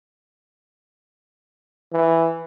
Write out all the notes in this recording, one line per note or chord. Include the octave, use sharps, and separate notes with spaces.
E3